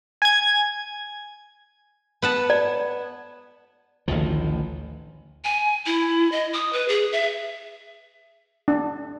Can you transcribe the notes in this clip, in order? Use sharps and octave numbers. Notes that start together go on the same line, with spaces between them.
G#5 G#6
B3 F#5 A5
D5
A1 D2 D#3 F3
G#5
E4
D#5
D#6
B4
G#4
E5
D4